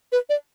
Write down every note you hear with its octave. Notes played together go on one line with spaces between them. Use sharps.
B4
D5